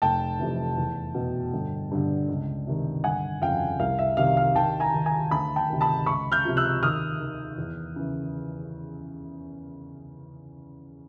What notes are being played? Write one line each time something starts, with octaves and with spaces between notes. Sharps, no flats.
F1 G5 A5
F2 C3 E3
E2
B2
G1
G2 D3
C#2
C3 D#3
G1 F#5 G#5
F2 C#3 F5 G5
C2 F5
E5
C3 D#3 F5
F5
D#2 G5 A5
G#5 A#5
D#3
G#5 A#5
D2 A5 B5
G5 A5
C3 D#3
A5 B5
C#2 B5 C#6
F6 G6
C3 F3
E6 F#6
D#2 D#6 F6
D#3
E2
C#3 E3